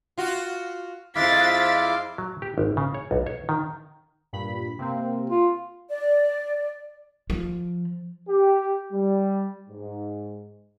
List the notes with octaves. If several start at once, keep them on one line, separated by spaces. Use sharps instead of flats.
F4 F#4
F2 F3 G#3 E4 F5 D6 A6 B6
F#3
G4
G#1
C#3
C#5
B1
C#5
D#3
G2 A#2 B5
C3 A#3 C4
F4
D5
F3
G4
G3
G#2